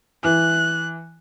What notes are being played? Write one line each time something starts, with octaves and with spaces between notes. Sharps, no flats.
E3 F#6